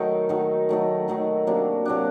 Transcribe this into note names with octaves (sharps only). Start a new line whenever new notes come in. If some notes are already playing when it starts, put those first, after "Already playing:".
Already playing: D#3 F#3 A3 D#4
D#3 F#3 A3 D#4
D#3 F#3 A3 D#4
D#3 F#3 A3 D#4
C3 F#3 A#3 D4
C3 F#3 A#3 D4